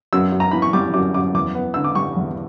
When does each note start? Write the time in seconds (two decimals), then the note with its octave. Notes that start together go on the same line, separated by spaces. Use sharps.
0.13 F#2 E6
0.32 F#2
0.40 A#5
0.51 E3 B5
0.62 C#6
0.73 G3 D6
0.94 F#2 D6
1.14 F#2 D6
1.34 E2 D6
1.55 B3
1.74 D3 E6
1.84 D6
1.95 G3 C#6
2.17 E2